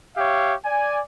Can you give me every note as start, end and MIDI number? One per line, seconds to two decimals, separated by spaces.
0.17 0.55 67
0.17 0.55 73
0.17 0.55 76
0.17 0.55 77
0.65 0.99 74
0.65 0.99 80